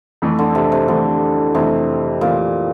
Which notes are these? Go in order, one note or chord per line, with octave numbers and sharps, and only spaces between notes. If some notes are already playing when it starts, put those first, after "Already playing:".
F2 E3 A3
D3
C3
C3
F2 D3 E3 A3
F2 C3 E3 A3
F2 A#2 E3 A3